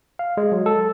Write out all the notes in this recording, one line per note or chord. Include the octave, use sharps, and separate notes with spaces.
F5
G#3
F#3
A4